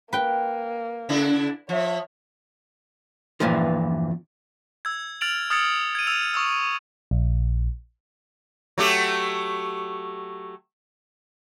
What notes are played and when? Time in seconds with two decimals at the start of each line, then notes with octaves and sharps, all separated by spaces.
0.13 A#3 B4 G5
1.09 C#3 D4 E4
1.69 F3 C#5 E5
3.40 E2 G2 A#2 E3 F3
4.85 E6 G#6
5.21 F6 A6 D7 F7 F#7
5.50 D#6 F6 G#6 A6 C#7
5.95 G#6 D#7
6.07 E6 G#6 D#7 F7
6.34 C#6 D#6 E6
7.11 A#1
8.78 F#3 A3 G4